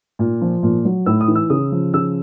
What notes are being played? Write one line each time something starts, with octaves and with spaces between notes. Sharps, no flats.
A#2
F3
A#2
F#3
A2 E6
D#6
E3
E6
C#3 D#6
F3
C#3 E6